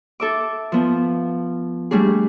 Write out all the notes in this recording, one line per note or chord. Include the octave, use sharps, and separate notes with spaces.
A4 E5 D6
F3 B3
G3 A3 D4 G#4